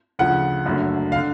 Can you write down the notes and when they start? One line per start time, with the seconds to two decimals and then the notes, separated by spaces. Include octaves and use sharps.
0.19 D2 C#3 F3 F#5
0.65 F#1 F#2 D3 F#3 A3
1.12 F5
1.16 D3